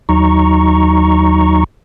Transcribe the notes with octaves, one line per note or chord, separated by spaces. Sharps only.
D#2 F#3 D#4 A#5 C#6